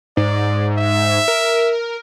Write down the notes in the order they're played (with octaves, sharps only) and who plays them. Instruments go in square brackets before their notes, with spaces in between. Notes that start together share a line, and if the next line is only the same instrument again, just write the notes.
[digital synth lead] G#2 [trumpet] D5
[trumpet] E5
[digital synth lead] A#4